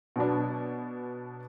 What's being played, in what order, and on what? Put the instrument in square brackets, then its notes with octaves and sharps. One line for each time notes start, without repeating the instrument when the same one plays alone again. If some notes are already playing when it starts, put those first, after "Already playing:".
[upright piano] B2 F#3 B3 D4